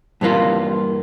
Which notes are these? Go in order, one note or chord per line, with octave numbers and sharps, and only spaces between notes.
G2 A#2 E3 A#3 F4